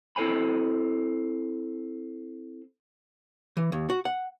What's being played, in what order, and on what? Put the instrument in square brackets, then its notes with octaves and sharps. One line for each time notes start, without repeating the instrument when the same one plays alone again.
[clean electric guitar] C4 E4 A4 C5 G#5 B5
[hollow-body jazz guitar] E3
D#2
F#4
F#5